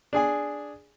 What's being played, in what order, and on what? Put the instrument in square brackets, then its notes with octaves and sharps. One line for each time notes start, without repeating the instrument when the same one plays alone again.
[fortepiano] D4 G#4 G#5